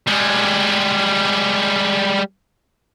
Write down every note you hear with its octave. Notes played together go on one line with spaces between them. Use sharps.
G3 G#3